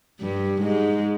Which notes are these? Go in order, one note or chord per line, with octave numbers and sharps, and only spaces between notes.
G2 G3
G#2 G#3